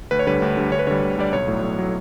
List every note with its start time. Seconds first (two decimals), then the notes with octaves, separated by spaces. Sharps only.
0.11 D2 B4
0.19 C#5
0.27 D3 G3 B4
0.42 D2
0.57 D3 G3
0.71 D2 C#5
0.79 B4
0.87 D3 G3 C#5
1.02 D2
1.17 D3 G3 D5
1.32 B1 C#5
1.48 A2 F#3
1.63 B1
1.78 A2 F#3